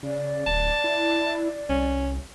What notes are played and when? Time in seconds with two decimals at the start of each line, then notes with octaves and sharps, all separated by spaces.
0.03 C#3 D5
0.47 D1 A5
0.84 E4
1.69 C2 C#4